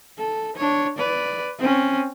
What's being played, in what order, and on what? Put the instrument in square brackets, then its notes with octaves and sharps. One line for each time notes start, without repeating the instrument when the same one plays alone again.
[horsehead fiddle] A4
D4 C#5
B4 D5
C4 C#4